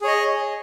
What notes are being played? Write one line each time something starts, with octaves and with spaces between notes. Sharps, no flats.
G#4 C#5 D#5